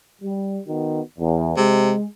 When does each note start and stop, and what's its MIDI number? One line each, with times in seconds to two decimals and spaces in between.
0.22 0.59 55
0.67 1.02 51
0.67 1.02 59
0.67 1.02 66
1.19 1.57 40
1.57 1.93 48
1.57 2.05 56